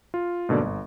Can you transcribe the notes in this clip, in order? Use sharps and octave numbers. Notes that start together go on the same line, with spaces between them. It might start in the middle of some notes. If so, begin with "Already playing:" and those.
F4
G#2 B2 D3 A#3 D5
G1